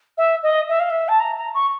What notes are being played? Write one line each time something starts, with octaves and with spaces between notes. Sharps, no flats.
E5
D#5
E5
F5
E5
A5
A#5
A#5
C#6